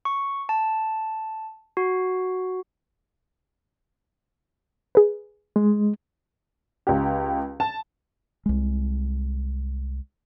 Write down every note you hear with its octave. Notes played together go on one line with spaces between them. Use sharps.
C#6
A5
F#4
G#4 B4
G#3
C#2 G4
A5
C2 G#3